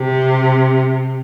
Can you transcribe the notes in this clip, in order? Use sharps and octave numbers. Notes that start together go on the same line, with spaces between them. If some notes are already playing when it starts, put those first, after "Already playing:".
Already playing: C3